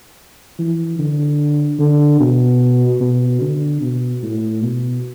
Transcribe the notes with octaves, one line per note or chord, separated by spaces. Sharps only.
E3
D3
D3
B2
B2
D3
B2
A2
B2